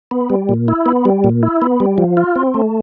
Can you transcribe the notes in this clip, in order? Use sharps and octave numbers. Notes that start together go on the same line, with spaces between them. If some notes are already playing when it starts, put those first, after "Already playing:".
B3
G3
A#2
E4
B3
G3
A#2
E4
B3
G3
F3
F4
C4
A3